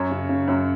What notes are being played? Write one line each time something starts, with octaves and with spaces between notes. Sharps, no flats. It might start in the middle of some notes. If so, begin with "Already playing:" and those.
Already playing: F#2 C#5
C#3
C#3
F#2